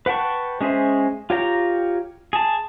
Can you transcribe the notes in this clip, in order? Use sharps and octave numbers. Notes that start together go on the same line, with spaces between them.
B4 F#5 G5 A5 C#6
G#3 C#4 G#4 C5 E5
F4 G4 C#5 G5 A#5
G#4 A5